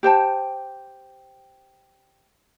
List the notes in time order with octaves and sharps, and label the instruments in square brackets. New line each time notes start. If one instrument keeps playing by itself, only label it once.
[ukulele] G4 C5 G5 A5